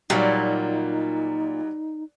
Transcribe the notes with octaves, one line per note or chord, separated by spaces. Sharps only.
A#2 F#3 G3 D#4 F#4